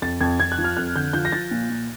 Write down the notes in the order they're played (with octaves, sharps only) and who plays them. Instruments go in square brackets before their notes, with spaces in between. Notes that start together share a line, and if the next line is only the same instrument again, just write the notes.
[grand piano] F2 A6
F2 G#6
F2 G#6
F#6
F3
F6
F2 F#6
D3 G6
F3 G6
A#6
F3 A6
A#2
A#2